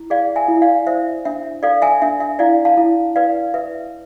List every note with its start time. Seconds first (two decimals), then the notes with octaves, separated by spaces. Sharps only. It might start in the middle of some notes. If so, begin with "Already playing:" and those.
Already playing: E4
0.10 G#4 D5 F5
0.36 E5 G#5
0.48 E4
0.62 D5 F5
0.87 C5 E5
1.25 D4 E5
1.63 A4 D5 F5
1.82 E5 G#5
2.02 D4 E5
2.20 E5
2.39 E4 D5 F5
2.65 F5 A5
2.77 E4
3.16 B4 D5 F5
3.54 B4 E5